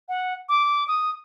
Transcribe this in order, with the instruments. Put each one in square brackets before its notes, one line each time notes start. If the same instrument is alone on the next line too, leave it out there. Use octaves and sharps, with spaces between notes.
[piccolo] F#5
D6
D#6